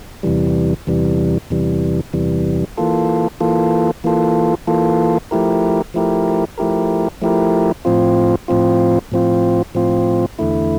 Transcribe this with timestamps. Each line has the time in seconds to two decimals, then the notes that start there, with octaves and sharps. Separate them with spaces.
0.23 E2 C3 E3 G3
0.87 E2 C3 E3 G3
1.50 E2 C3 E3 G3
2.13 E2 C3 E3 G3
2.77 E3 A#3 F4 A4
3.40 E3 A#3 F4 A4
4.04 E3 A#3 F4 A4
4.67 E3 A#3 F4 A4
5.31 F3 A3 E4 G4 A#4
5.94 F3 A3 E4 G4 A#4
6.58 F3 A3 E4 G4 A#4
7.22 F3 A3 E4 G4 A#4
7.85 A2 F3 C4 F4
8.48 A2 F3 C4 F4
9.12 A2 F3 C4 F4
9.75 A2 F3 C4 F4
10.39 E2 D3 A3 E4